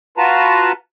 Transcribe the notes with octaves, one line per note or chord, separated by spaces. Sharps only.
F4 F#4 B4 A5 A#5